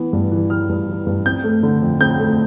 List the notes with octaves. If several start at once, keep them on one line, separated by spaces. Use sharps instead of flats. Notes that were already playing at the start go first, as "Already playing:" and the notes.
Already playing: E3 B3
G2
E3
E3 F6
G2
E3
G2
C4 G6
A3
D3
F2
C4 G6
A3